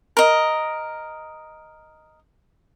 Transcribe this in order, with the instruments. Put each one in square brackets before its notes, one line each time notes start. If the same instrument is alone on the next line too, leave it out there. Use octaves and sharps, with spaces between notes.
[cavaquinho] A#4 D#5